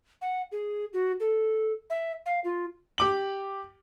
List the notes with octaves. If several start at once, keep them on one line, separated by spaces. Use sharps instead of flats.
F#5
G#4
F#4
A4
E5
F5
F4
G4 D6 F#7